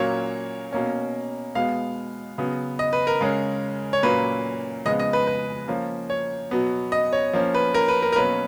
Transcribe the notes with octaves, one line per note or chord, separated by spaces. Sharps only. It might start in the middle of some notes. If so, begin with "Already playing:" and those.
Already playing: A#2 F#3 A#3 C#4 C#5
B2 A#3 C#4
B2 G#3 B3 F5
C#3 F#3 B3
D#5
B4
A#4
C#3 G#3 C#4
C#5
A#2 F#3 A#3 C#4 B4
C#3 F3 G#3 B3 D#5
D#5
B4
B4
F3 A#3 C#4
C#5
B2 F#3 B3
D#5
C#5
F3 A#3 C#4
B4
A#4
B4
A#4
A#4
B2 F#3 A#3 C#4 B4